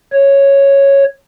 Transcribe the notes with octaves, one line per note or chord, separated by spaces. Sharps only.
C#5